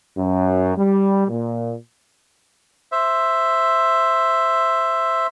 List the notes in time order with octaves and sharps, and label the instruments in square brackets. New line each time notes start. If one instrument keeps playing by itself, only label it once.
[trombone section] F#2
G3
A#2
[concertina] C5 E5